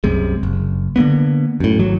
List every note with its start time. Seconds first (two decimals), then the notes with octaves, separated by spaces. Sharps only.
0.04 C2 F#2 C3 G#3
0.43 F#1
0.96 D3 F#3 A#3 B3
1.60 F#2 A2
1.79 G#1 G#2 F#3